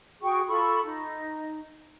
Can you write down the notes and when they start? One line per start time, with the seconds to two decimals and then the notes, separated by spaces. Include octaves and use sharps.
0.22 F#4 G#4 G5 C#6
0.48 F4 A4 B5 C#6
0.83 D#4